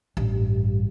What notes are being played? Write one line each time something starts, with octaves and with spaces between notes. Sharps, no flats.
A1 G2